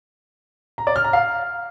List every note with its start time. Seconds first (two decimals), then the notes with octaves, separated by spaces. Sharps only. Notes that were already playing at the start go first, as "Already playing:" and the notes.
0.78 A#5
0.87 D5
0.96 F6
1.04 A#5
1.13 F5